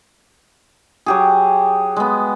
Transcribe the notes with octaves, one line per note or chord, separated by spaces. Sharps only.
F#3 G4 G#4
G#3 B3